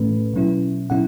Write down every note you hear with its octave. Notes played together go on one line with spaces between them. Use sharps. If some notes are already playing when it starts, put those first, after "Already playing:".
Already playing: A2 E3 A3 C#4 B4
B2 F#3 C#4 E4
B2 F#3 C#4 E4 F#5